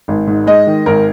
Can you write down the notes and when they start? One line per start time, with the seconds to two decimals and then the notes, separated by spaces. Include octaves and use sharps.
0.08 G#1
0.27 G#2
0.47 G#3 D#5
0.67 D#3
0.86 G#1 A#4